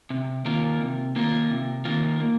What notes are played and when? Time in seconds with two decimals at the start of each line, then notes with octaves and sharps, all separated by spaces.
0.10 C3
0.45 D#3 A#3 F4 A#4
0.81 C3
1.16 D#3 A#3 F4 A#4
1.50 C3
1.85 D#3 A#3 F4 A#4
2.20 A#3